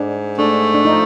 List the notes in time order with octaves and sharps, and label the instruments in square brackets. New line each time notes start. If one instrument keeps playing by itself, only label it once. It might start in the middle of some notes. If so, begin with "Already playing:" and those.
Already playing: [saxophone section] G#2 [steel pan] D4
[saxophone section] A3 [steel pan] D4
[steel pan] D4
[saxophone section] F3 [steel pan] D#4